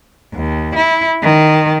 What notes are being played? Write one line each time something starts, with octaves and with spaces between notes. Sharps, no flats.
D#2
E4
D#3